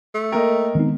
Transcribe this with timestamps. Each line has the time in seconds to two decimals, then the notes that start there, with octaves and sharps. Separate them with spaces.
0.15 A3
0.32 A#3 A#4 D#5 G5
0.75 D#3 G#3 B3 C4 D#4